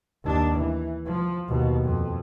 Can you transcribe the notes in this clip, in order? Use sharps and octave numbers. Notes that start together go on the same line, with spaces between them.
D#2 D4
E3
F3
D#2 B2
F2